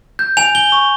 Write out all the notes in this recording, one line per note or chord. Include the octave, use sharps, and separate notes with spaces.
G6
G#5 F7
G#5 G7
C#6